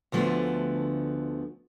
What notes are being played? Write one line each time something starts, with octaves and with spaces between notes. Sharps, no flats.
D2 D3 F3 G#3 A3 B3